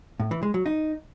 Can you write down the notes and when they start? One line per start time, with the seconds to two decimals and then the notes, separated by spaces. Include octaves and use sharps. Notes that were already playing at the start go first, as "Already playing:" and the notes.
0.20 A2
0.31 E3
0.43 G#3
0.54 F#3
0.66 D#4